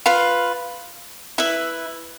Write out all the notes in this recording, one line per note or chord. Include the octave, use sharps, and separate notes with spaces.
F4 B4 F5 B5
E4 B4 E5